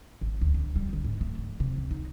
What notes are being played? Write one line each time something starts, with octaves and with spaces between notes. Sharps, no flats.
G#1
D2
D3
G3
D3
G#2
A3
D3
C3
C#2
D#4